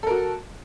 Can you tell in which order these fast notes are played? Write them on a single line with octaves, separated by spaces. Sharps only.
A4 A#4 F#4